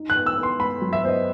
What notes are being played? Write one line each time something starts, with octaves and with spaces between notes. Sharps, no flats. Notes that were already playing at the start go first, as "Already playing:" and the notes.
Already playing: D#4
F#6
B3
E6
B3
C6
B3 B5
F#3
E5
B3 C5
D#5